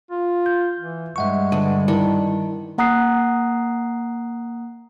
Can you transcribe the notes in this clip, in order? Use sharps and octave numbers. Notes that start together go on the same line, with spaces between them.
F4
G6
E3
G2 G#3 E5 F#5 C#6
D3 B4
D#3 D4 E4 D5 B5
A#3 F#5 A#5 D#6 F#6 C7